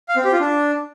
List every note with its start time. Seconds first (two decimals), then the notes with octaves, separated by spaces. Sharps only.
0.08 F5
0.16 C4
0.24 G4
0.32 F4
0.40 D4